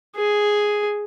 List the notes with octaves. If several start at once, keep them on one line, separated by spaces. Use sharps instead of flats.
G#4